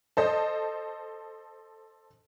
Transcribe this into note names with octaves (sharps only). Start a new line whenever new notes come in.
A4 C5 D#5